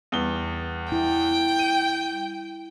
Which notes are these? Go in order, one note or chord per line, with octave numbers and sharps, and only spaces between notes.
E2 G3 G7
E4 G5
D#7